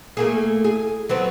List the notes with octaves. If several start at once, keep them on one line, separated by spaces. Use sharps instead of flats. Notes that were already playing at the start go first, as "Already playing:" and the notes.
A3 A#3 G#4
G#4
F#3 B3 C4